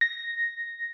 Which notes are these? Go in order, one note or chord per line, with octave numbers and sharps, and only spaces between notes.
A#6